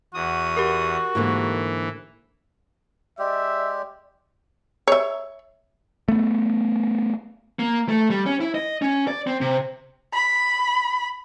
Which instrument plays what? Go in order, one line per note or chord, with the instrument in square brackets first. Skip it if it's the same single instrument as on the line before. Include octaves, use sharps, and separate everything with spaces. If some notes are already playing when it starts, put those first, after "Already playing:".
[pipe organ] E2 D#6 [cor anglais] F#4
[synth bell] G4 A#4
[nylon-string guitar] G#2 D3 A#3 [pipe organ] E3
[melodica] G#3 G4 [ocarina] D5 [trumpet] E5
[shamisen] C#5 E5
[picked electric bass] A3 B3
[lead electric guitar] A#3
A3
G3
C#4
E4
D#5
C#4
D5
C4
C3
[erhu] B5